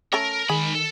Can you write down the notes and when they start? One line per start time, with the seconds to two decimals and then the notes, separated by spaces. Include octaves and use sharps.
0.13 A3 C#4 A4 A#4
0.50 D#3 G#3 G#4 B5
0.75 A4